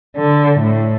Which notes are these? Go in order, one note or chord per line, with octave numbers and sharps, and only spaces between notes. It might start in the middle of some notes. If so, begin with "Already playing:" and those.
D3
A2